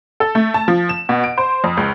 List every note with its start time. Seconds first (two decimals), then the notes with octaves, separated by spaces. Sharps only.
0.20 A4
0.35 A3
0.54 A5
0.68 F3
0.89 E7
1.09 B2
1.24 D7
1.38 C5
1.64 F2
1.77 C#2